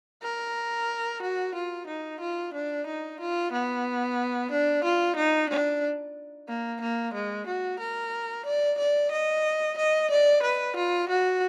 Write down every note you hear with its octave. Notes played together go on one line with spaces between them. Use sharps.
A#4
F#4
F4
D#4
F4
D4
D#4
F4
B3
D4
F4
D#4
D4
A#3
A#3
G#3
F#4
A#4
D5
D5
D#5
D#5
D5
B4
F4
F#4